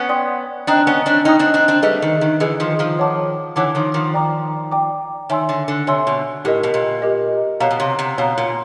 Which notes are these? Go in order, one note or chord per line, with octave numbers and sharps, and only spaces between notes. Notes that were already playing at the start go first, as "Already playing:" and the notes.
Already playing: B3 C#4
D5 G5 C6 D#6 F#6
C4 D4 D#5 G5 A#5 D#6
B3 C#4
C4 D4
C#4 D#4 D#5 G5 A#5 D#6
C4 D4
C4 D4
C4 D4
G3 A3 G#4 B4 D#5
D#3
D#3
D3 E3 G#4 B4 D#5
D#3 F3
D#3 F3
C#5 F#5 A5 D6
D3 E3 C#5 F#5 A5 D6
D#3 F3
D#3 F3
D5 G5 A#5 D6
D5 G5 A#5 D6
D#3 C#5 E5 G#5 C6 E6
D3
D3
C3 C#5 E5 G#5 C6 E6
B2
A2 G4 A#4 D#5
B2
A#2
G4 A#4 D#5
B2 C#5 F5 A#5
B2
C3
C3
B2 C#5 F5 A#5
A#2